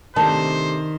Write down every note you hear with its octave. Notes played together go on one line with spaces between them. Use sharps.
C3 D#3 A3 D4 C5 A5